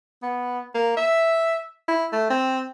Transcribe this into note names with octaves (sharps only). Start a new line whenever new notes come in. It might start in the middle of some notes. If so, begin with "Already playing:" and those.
B3
A#3
E5
E4
A3
C4